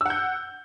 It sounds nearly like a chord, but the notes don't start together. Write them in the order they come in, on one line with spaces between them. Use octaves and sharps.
E6 F#5 G6